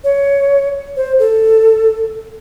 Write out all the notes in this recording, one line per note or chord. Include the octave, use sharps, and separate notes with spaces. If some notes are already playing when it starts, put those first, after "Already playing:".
C#5
C5
A4